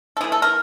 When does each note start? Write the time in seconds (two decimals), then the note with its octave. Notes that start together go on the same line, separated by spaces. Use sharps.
0.17 A4
0.21 E3 A3 G#4
0.32 A4
0.42 A#4